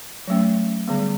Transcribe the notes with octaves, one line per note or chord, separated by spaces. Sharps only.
F#3 A3 C#4
D3 G3 B3